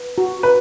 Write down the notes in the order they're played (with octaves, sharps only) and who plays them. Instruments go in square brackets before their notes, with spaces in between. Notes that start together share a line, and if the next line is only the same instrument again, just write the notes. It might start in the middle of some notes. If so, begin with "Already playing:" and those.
Already playing: [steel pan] B4
F#4
[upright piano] B4